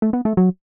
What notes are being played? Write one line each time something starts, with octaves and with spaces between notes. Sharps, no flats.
A3
B3
A3
F#3